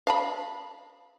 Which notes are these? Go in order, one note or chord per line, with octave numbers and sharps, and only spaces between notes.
F5 A5 B5